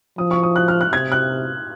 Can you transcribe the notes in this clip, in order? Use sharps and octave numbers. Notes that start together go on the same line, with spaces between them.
F3 D#6
C#6
D#6
F#6
F6
F#6
C3 G#6
F#6